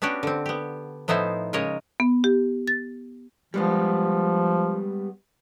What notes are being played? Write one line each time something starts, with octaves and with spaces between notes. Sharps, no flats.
B3 C#4 D4 F#4 G4
D3 C4
B3 G4
A2 F3 B3 D#4 E4 C5
C#3 G#3 A#4 C#5 D#5
B3
G4
A6
F3 G3 G#3 B3